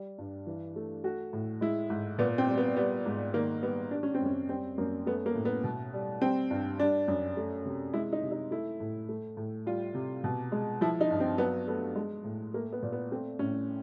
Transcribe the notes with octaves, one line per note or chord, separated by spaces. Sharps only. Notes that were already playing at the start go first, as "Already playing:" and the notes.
Already playing: G3
G2
E3
A3
A3 F#4
A2
G#3 E4
G#2
A#2 B3
C4
G3
B3
G3 B3
G#2
D#3 A#3
G3 B3
G3 D4
C#4
C4
F#2
C#4
G3 C4
F#2 A#3
A3 B3
A#3
A2
B3
B2
G3
G3 C4
G2
G3 D4
F#2
A3
C3
G#3 E4
D#4
C3
D#4
A3 E4
A2
A3
A2
G3 F4
C3
B2
G#3
F3 E4
D#4
G2
C4
F#3 B3
A3 B3
G#3
A2
A3 A#3
B3
A#2
B3
A3 C4
A2 C#4